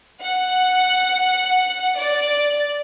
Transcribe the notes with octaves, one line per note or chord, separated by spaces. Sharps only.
F#5
D5